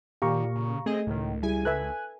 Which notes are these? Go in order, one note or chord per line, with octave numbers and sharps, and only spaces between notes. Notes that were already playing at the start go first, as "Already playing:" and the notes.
A#2 D#3 G4 F5 A#5 C#6
C#3
A3 C4 G#4 D#5
C#2 A2 D#3
G3 E4 G#4 G#5
A4 B4 E5 F#6